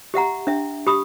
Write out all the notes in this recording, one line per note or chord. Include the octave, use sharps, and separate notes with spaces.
G4 E5 F#5 A#5
D4 E5
G4 B5 D#6